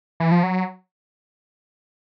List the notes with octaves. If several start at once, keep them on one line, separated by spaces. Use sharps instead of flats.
E3
F3
F#3